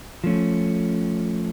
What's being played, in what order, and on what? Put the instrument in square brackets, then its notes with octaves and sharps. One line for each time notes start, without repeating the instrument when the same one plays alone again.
[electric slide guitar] F3 A3 C#4